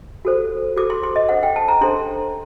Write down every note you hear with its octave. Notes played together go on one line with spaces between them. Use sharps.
F#4 A4 C5
F#4 A4 C5 D6
C6
C6
D#5
D4 A4 C5 F#5
G5
A5
A#5
D4 A4 C5 C6